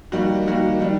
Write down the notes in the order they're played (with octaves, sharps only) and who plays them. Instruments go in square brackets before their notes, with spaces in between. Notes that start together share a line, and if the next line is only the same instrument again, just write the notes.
[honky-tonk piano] D#3 G3 A#3 F#4
D#3 G3 A#3 F#4
D#3 G3 D4